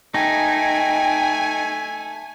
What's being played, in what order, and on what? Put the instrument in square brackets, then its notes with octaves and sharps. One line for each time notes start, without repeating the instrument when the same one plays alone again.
[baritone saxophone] A3 [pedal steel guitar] D#4 [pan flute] G5 [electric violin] G#5